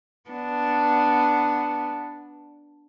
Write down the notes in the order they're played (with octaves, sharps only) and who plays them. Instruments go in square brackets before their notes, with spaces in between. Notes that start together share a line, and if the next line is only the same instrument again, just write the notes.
[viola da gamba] B3 D4